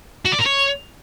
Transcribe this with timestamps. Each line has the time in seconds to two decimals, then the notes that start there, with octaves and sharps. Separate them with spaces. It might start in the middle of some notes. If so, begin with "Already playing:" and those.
0.25 F#4
0.32 D5
0.39 A#4
0.45 C#5